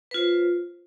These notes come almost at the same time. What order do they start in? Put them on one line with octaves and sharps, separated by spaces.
B4 F4 C5